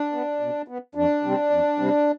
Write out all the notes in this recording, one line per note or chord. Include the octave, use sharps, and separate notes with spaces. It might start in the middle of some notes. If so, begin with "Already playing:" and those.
Already playing: D4
B3
B2
B3
F2 D4
C3 G3 C4
F2
C3 G3 C4